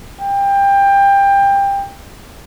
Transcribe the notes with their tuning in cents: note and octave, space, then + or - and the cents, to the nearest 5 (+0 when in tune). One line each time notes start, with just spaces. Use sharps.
G5 +20